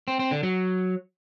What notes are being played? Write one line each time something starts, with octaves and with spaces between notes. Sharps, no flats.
C4
C4
D3
F#3